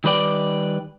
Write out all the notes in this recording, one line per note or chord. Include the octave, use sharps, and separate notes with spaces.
D#3 G3 B4 D5 G5